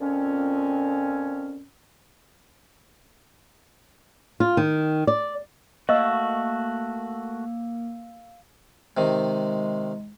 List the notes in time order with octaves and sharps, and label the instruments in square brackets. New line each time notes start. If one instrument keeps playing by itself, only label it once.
[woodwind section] F2 A#2 C4 C#4
[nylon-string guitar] F4
D#3
D5
[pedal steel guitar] A3 F#4 [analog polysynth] A#3 [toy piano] D#5 [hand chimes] F5 E6
[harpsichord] C3 D#3 [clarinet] G#3